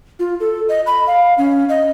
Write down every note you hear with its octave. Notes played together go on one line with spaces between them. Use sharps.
F4
A4
D#5
B5
F5
C#4
D#5